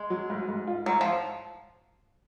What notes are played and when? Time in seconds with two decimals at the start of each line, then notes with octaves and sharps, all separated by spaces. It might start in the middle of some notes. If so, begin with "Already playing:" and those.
Already playing: G#3
0.10 F#3
0.30 G#2
0.49 G#2
0.67 F4
0.86 G#2 F#3
1.01 F3